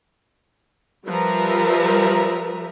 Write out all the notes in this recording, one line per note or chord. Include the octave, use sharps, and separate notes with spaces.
F3 G3 A#4 B4 E5 A#5